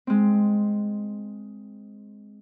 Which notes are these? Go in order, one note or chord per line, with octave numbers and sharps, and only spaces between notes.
G#3 C4